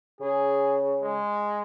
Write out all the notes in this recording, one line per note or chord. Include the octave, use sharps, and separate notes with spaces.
C#3 G#4
G#3